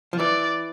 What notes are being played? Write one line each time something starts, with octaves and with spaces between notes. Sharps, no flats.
F3
E3 D5